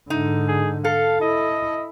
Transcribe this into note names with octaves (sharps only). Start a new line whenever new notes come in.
G#2 D3 D#4
G#4
A4 F5
E4 D#5